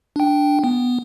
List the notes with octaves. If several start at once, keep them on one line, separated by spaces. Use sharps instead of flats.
D4 G5
B3